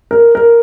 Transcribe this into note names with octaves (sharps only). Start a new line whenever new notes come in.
A#4
A#4